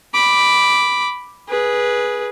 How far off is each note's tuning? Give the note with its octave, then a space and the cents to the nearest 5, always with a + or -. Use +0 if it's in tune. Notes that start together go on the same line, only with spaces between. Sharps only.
B5 +0 D6 +0
G#4 +0 B4 -15